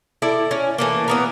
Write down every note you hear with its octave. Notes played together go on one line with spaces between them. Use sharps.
E4 A4 D5
C#4
E3 A3 A#3
E3 B3 A#4